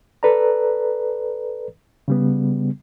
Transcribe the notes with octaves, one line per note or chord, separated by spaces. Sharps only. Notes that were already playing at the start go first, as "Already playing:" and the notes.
A4 B4 D5 A#5
C#3 G3 B3